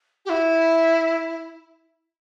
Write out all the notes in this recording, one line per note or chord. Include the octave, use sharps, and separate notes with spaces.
G4
E4